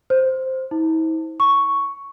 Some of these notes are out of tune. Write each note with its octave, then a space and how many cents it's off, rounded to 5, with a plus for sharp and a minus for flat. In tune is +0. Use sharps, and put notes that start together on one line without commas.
C5 +0
E4 -45
C#6 +0